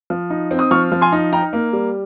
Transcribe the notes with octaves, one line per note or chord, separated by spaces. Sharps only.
F3
D#4
C4
D#6
F3 C#6 F6
F3
G#5 C6
D#4
D#4 G5 A#5
A#3
G3